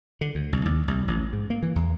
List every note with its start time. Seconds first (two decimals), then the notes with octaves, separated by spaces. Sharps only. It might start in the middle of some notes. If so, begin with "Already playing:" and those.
0.21 D3
0.35 D2
0.53 C2
0.65 D#2
0.88 C2
1.08 A1
1.33 G#2
1.50 A#3
1.63 E3
1.76 E2